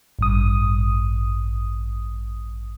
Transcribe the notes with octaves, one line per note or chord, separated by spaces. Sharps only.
A1 G2 D#6